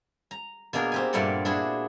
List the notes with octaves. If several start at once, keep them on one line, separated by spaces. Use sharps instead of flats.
A#5
B2 A#3 D4 G#4 A#4
C4 G4 G#5
G2 A#2 G3 A3 D5 F#5
D4 E4 F#4 G#4